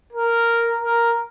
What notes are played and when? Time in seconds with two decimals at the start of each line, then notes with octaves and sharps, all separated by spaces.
0.13 A#4
0.81 A#4